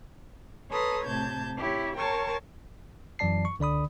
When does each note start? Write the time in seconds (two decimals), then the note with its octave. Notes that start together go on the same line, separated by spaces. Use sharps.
0.71 A4 B4 C#5 A#5 C6 D#6
1.06 A2 C3 A5 G6 G#6
1.57 E4 G4 C#5
1.96 A#4 C#5 G5 A5 C6 C#6
3.19 F#2 E3 F#3 D5 A5 C7
3.45 C#6
3.59 C#2 D3 D5 B5 D#6